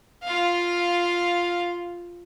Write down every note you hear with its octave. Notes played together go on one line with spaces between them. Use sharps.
F4 F5